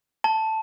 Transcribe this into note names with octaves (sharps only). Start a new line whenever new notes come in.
A5